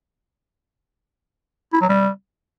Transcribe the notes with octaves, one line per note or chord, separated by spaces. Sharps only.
E4
F#3
G3